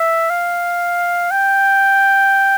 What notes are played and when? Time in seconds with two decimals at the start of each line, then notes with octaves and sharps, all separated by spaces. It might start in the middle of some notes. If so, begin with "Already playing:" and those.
Already playing: E5
0.30 F5
1.31 G5